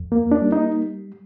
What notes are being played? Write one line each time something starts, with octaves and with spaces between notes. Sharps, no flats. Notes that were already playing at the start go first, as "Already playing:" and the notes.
Already playing: F2
A#3
D4
G3
D#4